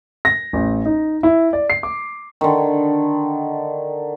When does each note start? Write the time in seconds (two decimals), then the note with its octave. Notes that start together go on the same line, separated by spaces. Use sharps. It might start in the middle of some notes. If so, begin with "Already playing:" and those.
0.25 A#6
0.53 A1
0.86 D#4
1.23 E4
1.53 D5
1.70 C7
1.83 D6
2.41 D3 D#3